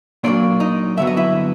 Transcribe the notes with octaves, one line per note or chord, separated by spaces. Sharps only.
A#2 F#3 A#3 D4 D5
D#4 D#5
G2 D3 F#3 B3 E5
D#5
E4 E5